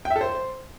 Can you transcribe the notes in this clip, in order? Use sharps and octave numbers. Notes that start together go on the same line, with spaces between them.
G5
E5
A4
C5